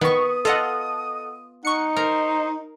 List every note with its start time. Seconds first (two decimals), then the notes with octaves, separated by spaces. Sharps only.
0.01 D#3 B3 C#6 D#6
0.45 F4 A4 D#5 F#5
1.65 D#4 F#5 C#6 C#7
1.96 A#4 C5